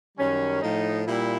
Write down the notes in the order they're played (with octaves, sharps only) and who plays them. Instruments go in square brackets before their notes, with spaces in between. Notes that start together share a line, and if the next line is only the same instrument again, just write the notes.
[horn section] F#2 D#3 G3 C#4
A2 F3 D#4
A#2 G3 E4